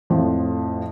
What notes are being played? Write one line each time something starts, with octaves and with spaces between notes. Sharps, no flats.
F2 A2 F3